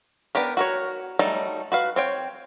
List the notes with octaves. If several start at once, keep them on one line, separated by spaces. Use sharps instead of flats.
B3 D4 G4 A#4
F#4 A#4 C#5
F#3 G3 A3 D#4 A4
F#4 B4 F5
C4 C#5 G5